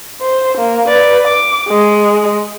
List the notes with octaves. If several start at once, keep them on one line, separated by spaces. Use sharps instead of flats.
C5
A#3
B4 D5
D6
G#3